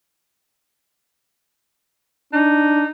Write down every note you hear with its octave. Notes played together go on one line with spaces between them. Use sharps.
D4 D#4